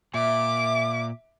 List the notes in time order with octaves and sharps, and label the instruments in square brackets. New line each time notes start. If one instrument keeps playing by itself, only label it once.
[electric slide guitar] A#2 [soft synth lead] E5 [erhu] D6